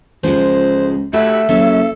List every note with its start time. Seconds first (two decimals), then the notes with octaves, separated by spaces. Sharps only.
0.23 C#2 F3 G#3 C5
1.13 A3 F#4 G4 E5
1.49 F#1 F#3 A4